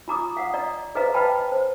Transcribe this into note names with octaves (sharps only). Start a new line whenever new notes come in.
F4 A#5 D6 D#6
F5 F#5 D#6
D5 D#5 A#5
G#4 B4 C5 D#5 F5 A#5
B4 D#5 F5 G5 A5 B5
C5